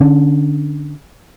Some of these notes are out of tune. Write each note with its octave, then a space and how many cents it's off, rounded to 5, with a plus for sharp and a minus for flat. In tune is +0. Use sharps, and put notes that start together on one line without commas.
D3 +15 C#4 +0